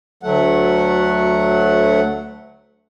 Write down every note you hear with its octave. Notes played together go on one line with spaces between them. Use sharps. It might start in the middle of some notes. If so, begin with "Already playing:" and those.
D2 F#3 A3 F#5